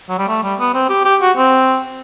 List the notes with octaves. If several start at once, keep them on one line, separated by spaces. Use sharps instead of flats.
F#3
G3
A3
G3
B3
C4
G4
G4
F#4
C4